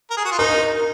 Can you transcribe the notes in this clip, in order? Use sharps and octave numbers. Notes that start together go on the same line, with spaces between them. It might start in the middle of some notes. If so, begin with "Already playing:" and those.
A#4
G#4
F#4
F4
D#4 A#4